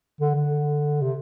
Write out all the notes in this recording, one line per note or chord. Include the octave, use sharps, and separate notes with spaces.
D3
D3
C3